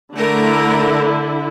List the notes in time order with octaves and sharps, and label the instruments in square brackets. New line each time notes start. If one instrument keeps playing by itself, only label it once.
[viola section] D3 E4 [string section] A3 A#4